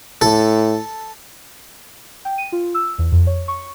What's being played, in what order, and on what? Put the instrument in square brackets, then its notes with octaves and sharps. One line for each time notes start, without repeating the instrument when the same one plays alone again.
[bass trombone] A2 [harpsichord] A4
[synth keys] G5
D#7
F4
E6
E2
F2
C#5
C#6